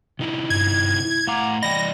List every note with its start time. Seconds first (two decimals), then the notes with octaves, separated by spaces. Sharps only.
0.19 C3 D#4 E4
0.50 G2 G#6
1.05 E4
1.27 A2 F5 F#5 A#5 D6
1.63 E3 D5 D#5 G5 B5 A#6